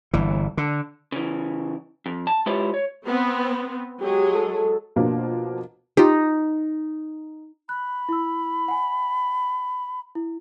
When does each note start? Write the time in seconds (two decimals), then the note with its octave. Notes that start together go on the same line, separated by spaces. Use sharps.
0.13 G1 E3
0.57 D3
1.12 C#3 E3
2.06 F2
2.27 A5
2.46 G#3 E4 F4 G4 B4 C#5
2.74 C#5
3.07 B3 C4
4.01 F#3 G#3 G4 G#4
4.35 A4
4.96 B2 F3 A#3 D4
5.97 D#4 F4 G4
7.69 B5 F#6
8.09 E4 E6
8.68 F#5 G#5
10.15 E4